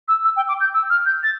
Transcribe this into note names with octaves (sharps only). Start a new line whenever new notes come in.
E6
E6
G5
D6
G6
E6
F6
G6
A6